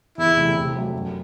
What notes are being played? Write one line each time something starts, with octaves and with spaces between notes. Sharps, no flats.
E2 E4
C3 E3 A3
C3
F#3 A3
F#2